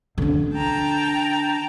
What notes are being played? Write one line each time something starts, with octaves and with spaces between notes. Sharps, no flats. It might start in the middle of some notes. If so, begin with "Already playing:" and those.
D3 D4
G5 A5 A#5